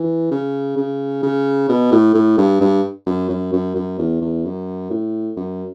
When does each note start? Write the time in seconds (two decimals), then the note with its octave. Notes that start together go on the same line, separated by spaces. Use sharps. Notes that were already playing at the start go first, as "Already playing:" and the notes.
Already playing: E3
0.31 C#3
0.77 C#3
1.23 C#3
1.69 B2
1.91 A2
2.15 A2
2.38 G2
2.61 G2
3.06 F#2
3.30 F#2
3.53 F#2
3.75 F#2
3.98 E2
4.21 E2
4.45 F#2
4.90 A2
5.36 F#2